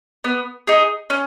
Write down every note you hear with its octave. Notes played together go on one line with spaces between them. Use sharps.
B3
D#4 G#4
C#4